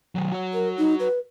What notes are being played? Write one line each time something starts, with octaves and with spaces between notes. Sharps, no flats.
D#3 F#3
F#4 C#5
A#4
D#4
B4